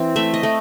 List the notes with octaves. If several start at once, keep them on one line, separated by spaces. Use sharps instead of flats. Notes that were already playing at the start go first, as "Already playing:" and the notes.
Already playing: E3 C4
A3 E5
D#5
A3